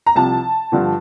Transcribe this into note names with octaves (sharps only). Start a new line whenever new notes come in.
A#5
C2 C3 F3 A5
G2 D3 F3